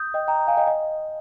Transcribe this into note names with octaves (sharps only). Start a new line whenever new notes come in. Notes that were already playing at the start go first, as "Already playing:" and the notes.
Already playing: D#6 G6
D#5 G5
G5 A#5
F5 G#5
D#5 G5
D#5